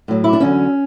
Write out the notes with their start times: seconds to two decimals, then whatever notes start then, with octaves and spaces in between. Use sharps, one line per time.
0.08 A2 F#3
0.24 E4
0.33 D4
0.40 E2 D3 F#3 C#4